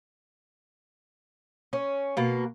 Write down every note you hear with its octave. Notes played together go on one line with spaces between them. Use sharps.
C#4
B2 A#3